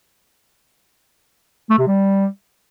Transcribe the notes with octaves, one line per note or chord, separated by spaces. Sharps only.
A3
C3
G3